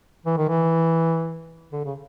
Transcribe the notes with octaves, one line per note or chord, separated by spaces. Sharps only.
E3
D#3
E3
D3
C#3